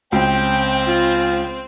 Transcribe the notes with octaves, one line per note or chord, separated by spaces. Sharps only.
C#2 C4 G5
F4